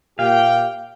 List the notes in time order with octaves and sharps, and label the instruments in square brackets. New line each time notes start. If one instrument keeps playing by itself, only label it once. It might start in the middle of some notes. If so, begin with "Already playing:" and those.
[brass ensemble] A#2 G4 G5 [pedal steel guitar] F5